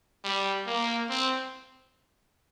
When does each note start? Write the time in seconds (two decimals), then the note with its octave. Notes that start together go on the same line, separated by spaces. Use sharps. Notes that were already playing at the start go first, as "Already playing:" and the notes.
0.24 G3
0.66 A#3
1.10 C4